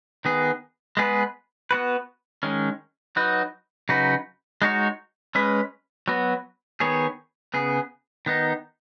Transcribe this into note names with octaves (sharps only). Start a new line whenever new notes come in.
D#3 B3 G#4
G#3 B3 G#4 B4
B3 F#4 B4
D#3 G#3 C#4
F#3 D#4 F#4 B4
C#3 F#3 D#4 F#4 B4
G#3 D#4 F#4 C#5
G#3 C#4 B4
F#3 B3 F#4
D#3 B3 G#4 C#5
C#3 B3 G#4
D#3 B3 D#4